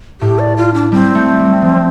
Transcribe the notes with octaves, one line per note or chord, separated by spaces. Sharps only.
A2 G4
D5
F4
D4
G3 C4
A3
G3
F3